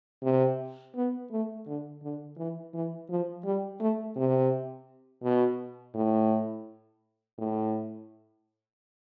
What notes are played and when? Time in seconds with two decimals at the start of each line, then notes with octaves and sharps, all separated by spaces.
0.23 C3
0.96 B3
1.31 A3
1.67 D3
2.03 D3
2.37 E3
2.74 E3
3.10 F3
3.45 G3
3.80 A3
4.16 C3
5.24 B2
5.95 A2
7.38 A2